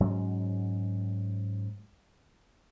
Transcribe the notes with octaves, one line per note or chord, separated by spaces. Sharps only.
G#2 F#3 G#3 C#4